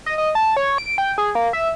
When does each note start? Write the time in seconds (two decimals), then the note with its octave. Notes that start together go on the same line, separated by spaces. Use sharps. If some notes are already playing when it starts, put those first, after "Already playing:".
0.06 D#5
0.18 D#5
0.35 A5
0.56 C#5
0.78 D7
0.98 G5
1.18 G#4
1.35 A#3
1.53 E5